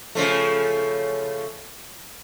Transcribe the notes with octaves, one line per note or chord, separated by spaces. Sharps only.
C#3 F3 A3